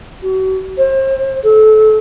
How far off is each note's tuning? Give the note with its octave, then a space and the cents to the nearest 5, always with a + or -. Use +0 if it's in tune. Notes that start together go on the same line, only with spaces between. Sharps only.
F#4 +40
C5 +35
A4 -25